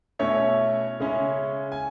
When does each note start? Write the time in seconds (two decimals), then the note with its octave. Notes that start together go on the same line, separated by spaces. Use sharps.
0.19 B2 A3 C#4 E4 C#5
1.00 C#3 G#3 C#4 E4
1.72 G#5